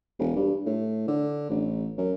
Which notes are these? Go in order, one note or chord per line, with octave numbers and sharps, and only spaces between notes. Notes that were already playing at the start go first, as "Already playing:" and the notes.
E1
G2
A2
D3
A1
F#2